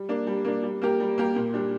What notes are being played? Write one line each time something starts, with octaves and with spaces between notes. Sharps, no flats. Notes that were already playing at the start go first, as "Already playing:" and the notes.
Already playing: G3
A#3 D4
G3
A#3 D4
G3
A#3 G4 A#4
G3
A#3 G4 A#4
A#2
G3 D4